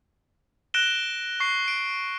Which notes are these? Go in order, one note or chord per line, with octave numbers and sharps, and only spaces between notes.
F#6 A#6 D7 E7 G7
C#6 C7
D7